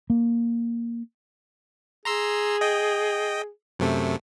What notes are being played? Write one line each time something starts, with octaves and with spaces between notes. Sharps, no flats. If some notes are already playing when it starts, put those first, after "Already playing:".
A#3
G#4 A#5 C6 E6
D#5 G5
F#2 C3 A3